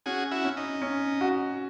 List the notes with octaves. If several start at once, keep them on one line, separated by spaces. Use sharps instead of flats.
C#4 F#4 G#4
E4 F#4
C#4
D#4
C#4
F#4